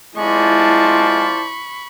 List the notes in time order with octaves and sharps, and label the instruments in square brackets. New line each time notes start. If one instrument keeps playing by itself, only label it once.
[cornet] G#3 [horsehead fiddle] E4 A5 [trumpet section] F4 C5 D5 [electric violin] B5 C#6